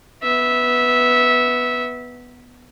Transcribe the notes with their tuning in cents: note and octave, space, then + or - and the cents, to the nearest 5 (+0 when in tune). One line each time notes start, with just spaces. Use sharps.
B3 +0 E5 -15